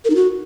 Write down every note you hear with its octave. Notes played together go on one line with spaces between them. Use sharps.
A#4
D#4
F#4